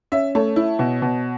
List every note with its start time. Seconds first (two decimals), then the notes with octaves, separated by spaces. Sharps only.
0.12 C#4 E5
0.35 A3 C#5
0.56 E4
0.79 B2
1.02 B2